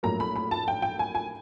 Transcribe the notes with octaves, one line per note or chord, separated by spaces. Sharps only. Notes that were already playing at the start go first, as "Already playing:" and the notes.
A#1 A2 F#3 A#3 A#5
B5
B5
A5
G5
G5
G#5
G#5